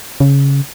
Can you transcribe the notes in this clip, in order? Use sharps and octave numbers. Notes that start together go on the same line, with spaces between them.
C#3